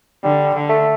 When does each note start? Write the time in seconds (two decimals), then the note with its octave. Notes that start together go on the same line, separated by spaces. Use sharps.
0.24 D3 G3
0.54 D3
0.69 A3